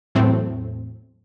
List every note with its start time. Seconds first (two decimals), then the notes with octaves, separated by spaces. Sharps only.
0.15 E2 A2 F#3 A3 C4